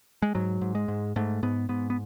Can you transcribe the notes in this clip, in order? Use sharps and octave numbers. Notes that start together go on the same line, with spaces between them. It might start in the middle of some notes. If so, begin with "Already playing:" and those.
G#3
G#2 F#3
G#2
G#3
G#2
G#2 A3
G#2 B3
G#2 B3
B3